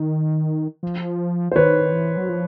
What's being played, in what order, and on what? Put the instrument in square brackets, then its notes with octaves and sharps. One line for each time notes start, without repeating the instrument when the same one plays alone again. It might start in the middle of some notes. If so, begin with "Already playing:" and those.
Already playing: [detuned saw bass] D#3
F3
[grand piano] C5
[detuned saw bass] D#3 [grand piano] B4 C#5
[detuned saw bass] E3
F#3
F3